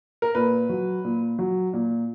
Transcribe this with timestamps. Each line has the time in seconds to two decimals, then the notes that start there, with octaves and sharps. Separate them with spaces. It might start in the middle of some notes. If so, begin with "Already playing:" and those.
0.22 A#4
0.35 A#2 B4
0.69 F#3
1.05 A#2
1.39 F#3
1.74 A#2